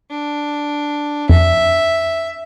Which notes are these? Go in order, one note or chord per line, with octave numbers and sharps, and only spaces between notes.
D4
F2 E5